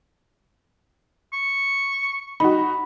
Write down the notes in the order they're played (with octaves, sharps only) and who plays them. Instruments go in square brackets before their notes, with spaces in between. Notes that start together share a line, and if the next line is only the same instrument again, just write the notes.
[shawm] C#6
[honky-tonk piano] D#4 F#4 [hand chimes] B5